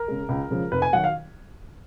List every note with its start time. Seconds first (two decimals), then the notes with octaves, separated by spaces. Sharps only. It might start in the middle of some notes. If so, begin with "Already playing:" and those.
Already playing: A#4
0.08 C#3 G#3
0.29 C#2
0.51 C#3 F3 G#3
0.71 F1 B4
0.82 G#5
0.93 D#3 F#3 F#5
1.04 F5